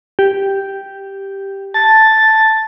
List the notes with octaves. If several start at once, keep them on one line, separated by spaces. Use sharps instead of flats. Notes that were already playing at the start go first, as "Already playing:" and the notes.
G4
A5 A6